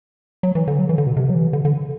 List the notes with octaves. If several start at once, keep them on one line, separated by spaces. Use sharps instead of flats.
F#3
E3
D3
F#3
E3
D3
B2
C3
F#3
E3
D3
D3